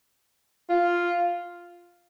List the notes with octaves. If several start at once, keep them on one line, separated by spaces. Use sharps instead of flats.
F4